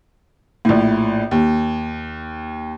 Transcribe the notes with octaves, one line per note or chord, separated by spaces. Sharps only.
A#1 A2
D#2